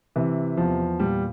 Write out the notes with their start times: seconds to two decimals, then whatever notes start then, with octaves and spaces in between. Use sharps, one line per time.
0.16 C3 E3
0.57 E2 F3
1.00 A#2 G3